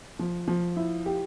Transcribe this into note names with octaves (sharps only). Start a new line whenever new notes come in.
F3
F3
E4
G4